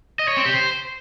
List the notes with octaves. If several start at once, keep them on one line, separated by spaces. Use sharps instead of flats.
D#5
C#5
C4
G4
C5